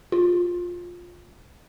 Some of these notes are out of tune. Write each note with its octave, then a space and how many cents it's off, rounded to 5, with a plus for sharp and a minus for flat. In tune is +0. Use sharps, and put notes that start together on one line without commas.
F4 +15